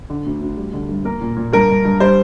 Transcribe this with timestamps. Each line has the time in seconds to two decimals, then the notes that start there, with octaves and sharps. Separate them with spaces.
0.10 D3
0.26 D2
0.41 D2
0.57 G3
0.73 D3
0.89 G2
1.05 A#3 A#4
1.21 A#2
1.36 A#2
1.53 G2 A#4
1.69 G2
1.85 G2
2.00 G3 C5